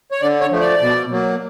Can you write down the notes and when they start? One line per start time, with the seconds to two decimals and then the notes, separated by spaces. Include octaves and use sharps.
0.11 C#5
0.21 D3 D5
0.41 C#5
0.51 F3 A3
0.61 D5
0.81 B2
1.11 F#3 A#3